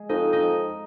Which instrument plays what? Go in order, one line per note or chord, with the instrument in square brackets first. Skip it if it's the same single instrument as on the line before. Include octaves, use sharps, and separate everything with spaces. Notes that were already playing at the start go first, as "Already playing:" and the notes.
Already playing: [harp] G#3
[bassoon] F2 [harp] D#4
[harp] D#4